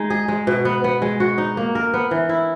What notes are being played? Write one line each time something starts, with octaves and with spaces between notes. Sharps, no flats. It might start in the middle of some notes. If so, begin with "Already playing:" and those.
Already playing: G#3 D#4
G#4
G#3
B2
B3
B3
G#3
F#4
D#4
A#3
A#4
B3
E3
E4